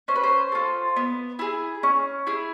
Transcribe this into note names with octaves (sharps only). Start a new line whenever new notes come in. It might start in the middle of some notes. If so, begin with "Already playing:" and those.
C#4 C5
B4
C5
F4 A4
B3
E4 G#4
C#4
E4 G#4